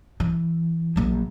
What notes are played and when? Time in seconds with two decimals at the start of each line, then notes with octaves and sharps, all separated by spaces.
0.20 E3
0.96 A#1 F#3